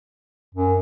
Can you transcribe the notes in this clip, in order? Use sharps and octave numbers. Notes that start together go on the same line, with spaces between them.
F#2